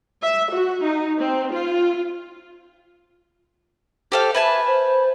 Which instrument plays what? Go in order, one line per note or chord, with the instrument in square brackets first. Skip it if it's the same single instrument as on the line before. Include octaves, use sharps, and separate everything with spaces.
[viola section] E5
F#4
D#4
C4
F4
[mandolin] G4 A4 F5 [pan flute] C5
[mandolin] B4 G#5 A5 [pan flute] E5
[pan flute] C5